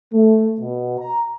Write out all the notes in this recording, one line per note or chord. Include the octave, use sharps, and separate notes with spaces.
A3
B2
A#5